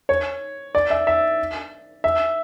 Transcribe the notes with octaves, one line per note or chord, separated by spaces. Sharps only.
C#5
D5
E5
E5
E5